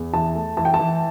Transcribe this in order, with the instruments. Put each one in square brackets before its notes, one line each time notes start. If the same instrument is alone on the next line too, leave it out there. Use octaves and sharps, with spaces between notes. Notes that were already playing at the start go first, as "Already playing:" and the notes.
Already playing: [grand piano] E2
[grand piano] E3 [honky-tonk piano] A5
[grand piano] A3
[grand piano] E3 [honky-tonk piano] A5
[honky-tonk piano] G5
A5
[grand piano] E3